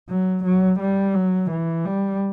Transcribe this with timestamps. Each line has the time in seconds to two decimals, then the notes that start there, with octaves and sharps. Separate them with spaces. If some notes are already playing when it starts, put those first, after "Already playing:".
0.09 F#3
0.44 F#3
0.79 G3
1.14 F#3
1.50 E3
1.85 G3